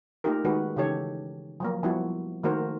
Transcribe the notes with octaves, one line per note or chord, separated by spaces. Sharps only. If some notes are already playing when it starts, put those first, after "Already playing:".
A3 A#3 D#4 F4 G4 A#4
D#3 G#3 D#4 F#4 B4
C#3 E3 D#4 G4 A4 C#5
F3 F#3 A#3
F3 G3 B3 E4 F#4
D#3 A3 A#3 F#4 A#4 C5